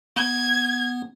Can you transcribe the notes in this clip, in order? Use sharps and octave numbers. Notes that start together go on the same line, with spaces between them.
B3 G#6